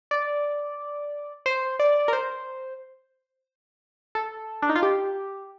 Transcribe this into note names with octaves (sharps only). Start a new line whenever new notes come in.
D5
C5
D5
A#4
C5
A4
D4
D#4
F4
G4